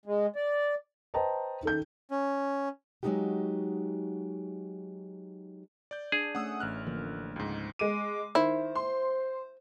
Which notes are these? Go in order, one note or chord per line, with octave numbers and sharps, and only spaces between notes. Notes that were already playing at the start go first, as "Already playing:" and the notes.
G#3
D5
B4 C5 D#5 G5 A5 A#5
D#3 A4 G6
C#4
F#3 G#3 A3 D#4 F#4 G4
D5 G6
D4 G#4
A3 C#4 F#5 D#6 E6
A1 F6 F#6
D3 F3 A#3
C#2 G#2
G#3 D6 D#7
D#3 E4 C5
C6